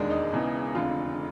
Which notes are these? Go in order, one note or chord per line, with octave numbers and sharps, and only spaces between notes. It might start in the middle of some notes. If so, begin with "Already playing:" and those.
Already playing: E1 D#2 D#3 G#3 D4 D5
D#4 D#5
E1 E2 C#3 E3
F1 F2 D3 F4 F5